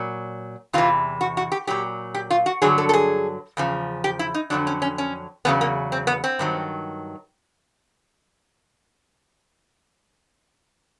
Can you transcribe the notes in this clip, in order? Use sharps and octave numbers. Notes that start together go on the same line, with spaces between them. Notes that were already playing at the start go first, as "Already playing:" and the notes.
Already playing: A#2 F#3
E2 C3 E3 F4
F#4
F#4
G4
A#2 F#3 G4
G4
F4
F#4
G2 D3 F#3 G#4
A4
A4
G#4
E2 C#3 F3
G4
E4
D#4
F2 D3 F#3 D4
C#4
C#4
C#4
E2 C#3 F#3 B3
A#3
C4
B3
C4
G2 D#3 F#3